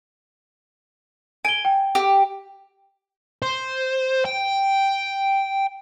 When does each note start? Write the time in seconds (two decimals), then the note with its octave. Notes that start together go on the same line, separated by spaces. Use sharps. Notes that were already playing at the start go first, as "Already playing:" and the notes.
1.45 G#5 D7 G7
1.65 G5
1.95 G4
3.42 C5
4.25 G5